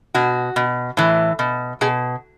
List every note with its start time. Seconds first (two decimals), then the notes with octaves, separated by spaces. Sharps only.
0.14 B2 F#4
0.56 B2
0.97 A2 E3
1.39 B2
1.81 B2 G#4